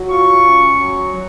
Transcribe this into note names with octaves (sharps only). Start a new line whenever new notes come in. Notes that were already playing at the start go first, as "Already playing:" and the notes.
Already playing: F#3
F4 C#6
C#4
F#3
F#3